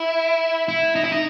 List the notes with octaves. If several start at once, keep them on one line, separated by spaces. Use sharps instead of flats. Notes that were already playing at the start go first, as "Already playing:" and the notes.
Already playing: E4
E4
D#4
E4
D#4